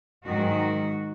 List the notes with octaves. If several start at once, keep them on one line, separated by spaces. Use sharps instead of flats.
G#2 D#3 F#3 F#4